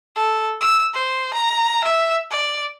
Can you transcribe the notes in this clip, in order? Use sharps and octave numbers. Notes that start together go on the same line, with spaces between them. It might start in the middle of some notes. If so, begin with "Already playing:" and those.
A4
E6
C5
A#5
E5
D5